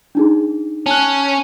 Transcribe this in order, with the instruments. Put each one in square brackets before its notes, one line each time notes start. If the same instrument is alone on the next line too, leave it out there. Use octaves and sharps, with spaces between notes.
[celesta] D4 D#4 G#4
[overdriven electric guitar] C#4 [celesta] A5 F#6